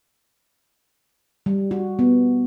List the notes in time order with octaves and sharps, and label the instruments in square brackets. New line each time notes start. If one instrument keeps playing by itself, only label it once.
[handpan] G3
F#4
B3